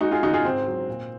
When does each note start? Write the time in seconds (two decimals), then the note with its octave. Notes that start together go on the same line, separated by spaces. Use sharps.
0.01 G#3 D#4 F#4
0.11 F4 G#4
0.23 C#3 D#4 F#4
0.34 F4 G#4
0.45 G#2 C4
0.67 F#3
0.88 A#2